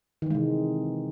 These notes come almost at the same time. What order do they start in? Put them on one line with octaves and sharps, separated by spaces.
D#3 E3 G#3 C3